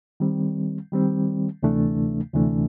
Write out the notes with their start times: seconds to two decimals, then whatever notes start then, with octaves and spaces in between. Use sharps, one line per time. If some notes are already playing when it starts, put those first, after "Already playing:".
0.20 D#3 G3 C4
0.92 D#3 G3 C4
1.63 D2 C3 E3 A3 D4
2.34 D2 C3 E3 A3 D4